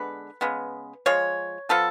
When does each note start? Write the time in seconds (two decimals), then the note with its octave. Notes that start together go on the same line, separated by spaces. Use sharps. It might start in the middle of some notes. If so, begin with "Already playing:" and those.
Already playing: D3 G#3 B3 B4
0.41 C#3 G#3 B3
1.06 F3 G#3 C#5
1.69 F3 B3 A4